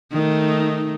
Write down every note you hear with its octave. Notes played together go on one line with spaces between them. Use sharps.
D#3 A3 D#4